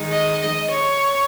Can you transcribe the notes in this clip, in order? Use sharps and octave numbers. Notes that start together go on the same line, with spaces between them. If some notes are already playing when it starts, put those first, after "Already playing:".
Already playing: D#3 G#3 D#4
D#5
D#5
C#5